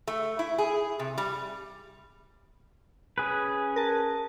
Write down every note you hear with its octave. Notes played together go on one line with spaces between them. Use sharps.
A3
E4
G#4
C3
G3
C#4 G#4 B4
A#4 A5